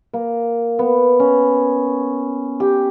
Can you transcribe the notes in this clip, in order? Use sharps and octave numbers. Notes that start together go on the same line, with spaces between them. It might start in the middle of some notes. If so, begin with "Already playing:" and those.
A#3
B3
C#4
G4